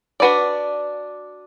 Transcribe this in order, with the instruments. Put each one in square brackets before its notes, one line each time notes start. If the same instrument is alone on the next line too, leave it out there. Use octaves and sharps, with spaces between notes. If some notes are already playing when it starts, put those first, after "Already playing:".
[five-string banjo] D4 F#4 B4 D5